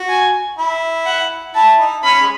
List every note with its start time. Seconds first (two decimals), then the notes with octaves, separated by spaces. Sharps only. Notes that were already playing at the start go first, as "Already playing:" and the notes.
Already playing: F#4
0.09 G#5
0.58 E4
1.06 F#5
1.55 E4 A5
1.80 D#4
2.04 C#4 B5
2.21 G#3